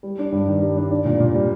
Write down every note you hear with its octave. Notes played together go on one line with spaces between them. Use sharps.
G3
D4
G2
D#3
G3
D4
D4
A#2
A#2
G3